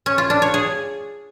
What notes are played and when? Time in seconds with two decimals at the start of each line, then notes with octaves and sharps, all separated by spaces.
0.06 C#4
0.18 F4
0.30 D4
0.42 C#5
0.54 G#4